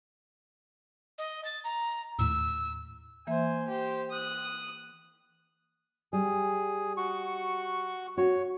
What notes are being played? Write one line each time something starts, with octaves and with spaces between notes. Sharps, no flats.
D#5
A6
A#5
D#2 A2 E6
E3 A#3 C5 E5 G#5
G4 C5
D#6 F#6
G3 G#4
F#4 C#6
F#4 C#5